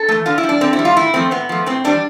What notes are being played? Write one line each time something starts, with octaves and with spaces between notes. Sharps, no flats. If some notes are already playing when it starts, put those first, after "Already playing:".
Already playing: A4
E3 A3
D3 F4
E4
G3
D4
D3 C4
E4
G3
F4
A2 E4
F3 A3 C4
A2 B3
F3 A3
A2 C4
E3 G3 D4